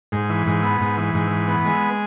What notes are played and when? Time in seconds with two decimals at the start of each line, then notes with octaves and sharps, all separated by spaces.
0.12 G#2
0.30 E3
0.47 G#2
0.63 B3
0.81 G#2
0.97 E3
1.14 G#2
1.31 E3
1.48 B3
1.65 G#3